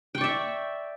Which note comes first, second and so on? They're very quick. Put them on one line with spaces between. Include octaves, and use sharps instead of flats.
G5 C#6 D5 E5